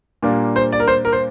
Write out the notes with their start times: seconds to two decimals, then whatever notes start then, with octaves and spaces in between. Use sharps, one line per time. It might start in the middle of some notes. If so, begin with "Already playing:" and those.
0.23 A#2 G3 A#3 D4
0.56 C5
0.72 D5
0.80 A#4
0.88 C5
1.05 A#4
1.12 C5